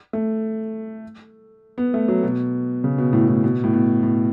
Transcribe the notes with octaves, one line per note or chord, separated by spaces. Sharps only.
A3
B3
A3
F#3
B2
C#3
B2
A2
A2
B2
A2
B2
A2